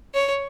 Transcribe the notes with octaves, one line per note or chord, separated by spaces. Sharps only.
C#5